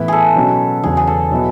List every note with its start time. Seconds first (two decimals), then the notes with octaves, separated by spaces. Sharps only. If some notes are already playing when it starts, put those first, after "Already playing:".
Already playing: A2 E3 B3 E4 B4
0.08 G#4 A4
0.36 B2 F#3 C#4
0.83 E2 C#3 F#3 G#4
0.97 G#4
1.07 A4
1.31 B2 F#3 B3 E4